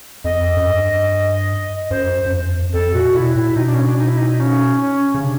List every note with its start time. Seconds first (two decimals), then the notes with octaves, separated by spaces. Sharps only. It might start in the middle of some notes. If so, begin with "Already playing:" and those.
0.24 F2 D#5
0.57 F#2
0.66 G2
1.91 F#2 C5
2.26 F#2
2.32 F2
2.73 F2 A4
2.94 A#2 F#4
3.15 B2 E4
3.35 A#2 E4
3.56 B2 D#4
3.66 D4
3.75 C#4
3.85 D4
3.98 D#4
4.08 E4
4.18 D#4
4.40 C#4
4.81 C#4
5.15 C#3
5.23 C3 D4